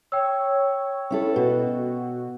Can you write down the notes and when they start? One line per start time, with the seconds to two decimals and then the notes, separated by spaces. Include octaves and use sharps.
0.12 C#5 G5 E6
1.10 C#4 E4 A4
1.36 B2 F#4